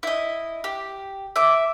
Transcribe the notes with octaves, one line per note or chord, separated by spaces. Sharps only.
E4 D#5
G4
E5 D6